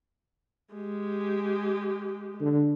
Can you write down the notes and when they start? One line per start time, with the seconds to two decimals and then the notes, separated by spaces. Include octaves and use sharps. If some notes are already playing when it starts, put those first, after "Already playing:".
0.74 G#3 G4
2.41 D3